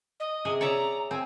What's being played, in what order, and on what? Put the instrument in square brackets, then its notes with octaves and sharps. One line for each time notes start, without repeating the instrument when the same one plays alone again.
[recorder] D#5
[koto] C3 G#4 G#5
[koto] C#5 D5 E5 [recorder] A#5
[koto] C4 [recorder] G#5